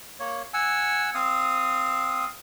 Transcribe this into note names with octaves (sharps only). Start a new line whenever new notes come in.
A#3 C#5
F#5 G#5 E6
C4 F5 D#6